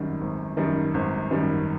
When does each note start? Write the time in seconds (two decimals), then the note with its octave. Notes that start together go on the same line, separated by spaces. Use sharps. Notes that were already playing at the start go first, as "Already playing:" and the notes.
Already playing: G#1 F#2 D#3 G3
0.21 G#1
0.57 F#2 D#3 G3
0.94 G#1
1.31 F#2 D#3 G3